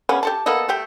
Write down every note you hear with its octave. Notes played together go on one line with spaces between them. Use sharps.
C#3 A#3 B3 C#4
G4 A4 A5
A#3 B3 A4 D#5
A3 G4 G5